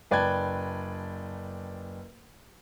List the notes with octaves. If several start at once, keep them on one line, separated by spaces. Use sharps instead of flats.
F#1 B4 D5 G5 A5 G#6